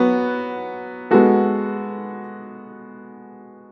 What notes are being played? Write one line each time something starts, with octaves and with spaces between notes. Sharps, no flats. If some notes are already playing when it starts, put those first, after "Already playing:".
Already playing: F#3 B3 F#4 B4
G#3 B3 F#4 A4